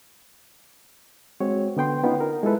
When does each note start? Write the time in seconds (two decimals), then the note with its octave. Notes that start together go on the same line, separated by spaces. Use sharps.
1.41 G#3 C4 F#4 C#5
1.77 D3 B3 G5 C6
2.04 B3 C#4 D#4 F4
2.20 A#4
2.43 G#3 E4 F4 A4 B4